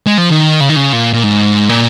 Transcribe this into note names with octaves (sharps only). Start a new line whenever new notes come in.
G#3
F3
D#3
C#3
D#3
C#3
A#2
A#2
G#2
A#2